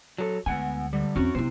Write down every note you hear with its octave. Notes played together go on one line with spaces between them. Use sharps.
F#3 A4
D2 G#3 B3 F#5 G#5
D3 G3
E2 C4 C#4 F#4
C3 B3 E4 C5